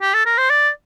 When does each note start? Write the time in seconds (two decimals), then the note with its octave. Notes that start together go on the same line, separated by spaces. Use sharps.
0.02 G4
0.14 A4
0.26 A#4
0.38 C5
0.50 D5